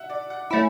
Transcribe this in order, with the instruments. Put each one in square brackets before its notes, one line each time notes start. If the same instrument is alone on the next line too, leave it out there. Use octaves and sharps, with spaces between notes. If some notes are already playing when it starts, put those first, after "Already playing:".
Already playing: [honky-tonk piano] E5 F#5
D5
F#5
[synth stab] A3 C#4 E4 [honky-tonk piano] E5